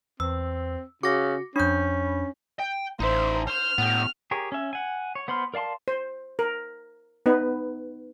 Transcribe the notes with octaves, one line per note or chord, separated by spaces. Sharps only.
E2 C4 E6
C#3 F#4 D6 A#6
F2 C#4 D4 B5 G6
G5
A1 D#4 C5 E5
C5 C6 F6
A2 B3 G4
G4 G#4 A#4 C#5
C#4 E5
F#5 G#5
C#5
B3 C5 B5 C6 F6
A#4 D5 F5 A5 C6
C5
A#4
B3 D#4 B4